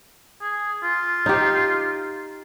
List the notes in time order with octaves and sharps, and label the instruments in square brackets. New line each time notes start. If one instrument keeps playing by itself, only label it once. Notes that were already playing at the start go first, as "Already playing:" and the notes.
[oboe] G#4
F4
[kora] D#4 G4